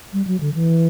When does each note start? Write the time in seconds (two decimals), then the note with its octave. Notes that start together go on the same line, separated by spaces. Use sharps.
0.13 G3
0.27 F#3
0.40 D3
0.54 E3